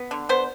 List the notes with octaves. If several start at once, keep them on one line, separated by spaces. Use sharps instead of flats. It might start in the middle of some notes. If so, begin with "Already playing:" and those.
Already playing: B3
D3
B3 C5